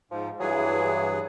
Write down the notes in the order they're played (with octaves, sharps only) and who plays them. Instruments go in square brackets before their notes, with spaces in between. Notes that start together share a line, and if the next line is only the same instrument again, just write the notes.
[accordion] G#2 [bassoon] F3
[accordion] G2 E3 G#4 [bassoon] F#3